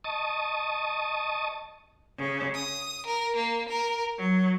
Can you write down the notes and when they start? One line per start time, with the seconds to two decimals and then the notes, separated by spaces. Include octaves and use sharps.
0.04 D#5 A5 C#6 D#6
2.18 C#3
2.54 D#6
3.05 A#4
3.35 A#3
3.69 A#4
4.16 F#3